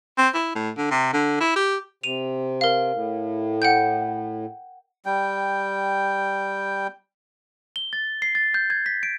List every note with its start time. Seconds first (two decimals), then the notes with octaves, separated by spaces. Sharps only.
0.18 C4
0.34 E4
0.55 A2
0.77 D3
0.90 C3
1.13 D3
1.40 E4
1.56 G4
2.03 C3 D#7 F7
2.61 A#4 F5
2.93 A2
3.62 F#5 G5 G6
5.06 G3 G5
7.76 G7
7.93 A6
8.22 C7
8.35 A6
8.54 G6
8.70 G#6
8.86 B6
9.03 D7